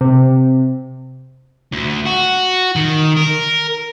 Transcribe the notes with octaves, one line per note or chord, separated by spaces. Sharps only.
C3
D2
F#4
D#3
A#4